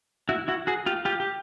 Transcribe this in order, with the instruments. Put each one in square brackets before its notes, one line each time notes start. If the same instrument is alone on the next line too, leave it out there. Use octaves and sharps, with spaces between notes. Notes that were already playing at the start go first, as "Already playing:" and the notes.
[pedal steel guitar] E4 F#4
E4 F#4
F#4 G#4
F4 G4
F4 G4
G4